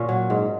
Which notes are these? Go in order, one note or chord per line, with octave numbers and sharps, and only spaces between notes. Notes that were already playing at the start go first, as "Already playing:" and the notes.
Already playing: A#2 C#4
F#3
G#2